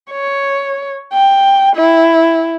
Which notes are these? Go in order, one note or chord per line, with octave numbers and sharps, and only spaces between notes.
C#5
G5
E4